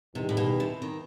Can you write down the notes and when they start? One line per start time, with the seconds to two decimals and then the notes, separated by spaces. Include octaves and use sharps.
0.15 E2 C3 D#3 G3 D#4 G4
0.29 A2
0.37 B2
0.60 C3
0.82 D#3